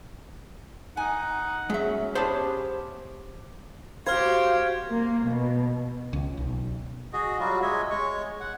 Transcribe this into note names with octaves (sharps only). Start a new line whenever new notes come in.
D#4 F#5 G#5
F#3 G#3 C#4 E5
B3 G4 G#4 C5 C#5 A5
F#4 G4 C5 F5 F6 G#6
A#3
B2
C#2
B1
F#4 G#4 D#5
F#3 G3 F4 F#4
G#3 C#5 D#5 E5
G#3 C#5 C#6
F#5